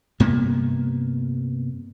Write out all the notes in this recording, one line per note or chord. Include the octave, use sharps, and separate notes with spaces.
G2 C3 A#3 B3